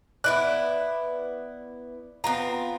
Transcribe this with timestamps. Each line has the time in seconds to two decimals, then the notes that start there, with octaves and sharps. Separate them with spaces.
0.24 B3 E4 D5 F#6
2.24 B3 C4 F4 A#5